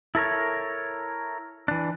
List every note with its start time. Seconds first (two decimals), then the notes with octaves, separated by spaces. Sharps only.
0.15 E4 A4 A#4 C#5
1.68 E3 D4